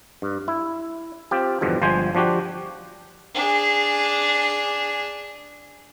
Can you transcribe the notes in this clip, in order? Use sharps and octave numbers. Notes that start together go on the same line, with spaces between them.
G2
E4
C4 F4 G4
E2 G2 B2 D3 F3
G1 F3 G#3 C5 G#5
F3 D4 F#4 G4
D4 G#4